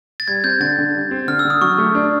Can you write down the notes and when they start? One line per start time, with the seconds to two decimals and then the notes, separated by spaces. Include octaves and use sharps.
0.20 A6
0.28 G3 G#6
0.44 C4 G6
0.60 D3 A6
0.78 D3
0.95 G3
1.11 C4
1.28 D3 F6
1.39 E6
1.45 D3
1.50 D#6
1.61 F#3 C#6
1.78 A3
1.95 D4